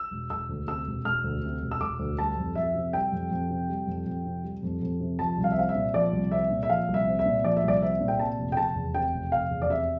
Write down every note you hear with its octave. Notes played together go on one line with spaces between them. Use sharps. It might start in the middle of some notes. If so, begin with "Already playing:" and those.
Already playing: E6
E1
E1 E6
D2
C3 E6
E1
E1 F6
D2
C3
E1
E6
E1 D6
D2
G3 A5
F2
F2 E5
C3
G3 G5
F2
F2
C3
G3
F2
F2
C3
G3
F2
F2
C3
F3 A5
C2
F5
E5
C4 F5
E5
A#2
F3 D5
C2
C4 E5
A#2
E5
F3 F5
C2
E5
C4
E5
A#2
F3 D5
E5
C2 D5
C4 E5
A#2
G5
C3 A5
F1
G5
F1 A5
E2
C3 G5
F1
F1 F5
E2
D5
C3 E5